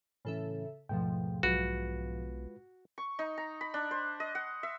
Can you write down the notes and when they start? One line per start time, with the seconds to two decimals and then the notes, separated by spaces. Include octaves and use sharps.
0.25 A2 C#3 E3 C#4 A4 E5
0.89 D#2 G#2 B2 F3 A3 G5
1.43 B1 G#3 F4 F#4 B4
2.98 C#6
3.19 D#4
3.38 A#5
3.61 B5
3.74 D4
3.91 C5
4.20 D#5
4.35 F#5
4.63 E5